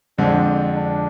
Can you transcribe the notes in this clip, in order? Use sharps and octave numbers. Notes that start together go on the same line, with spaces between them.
F2 D3 G#3 C4 D4
D4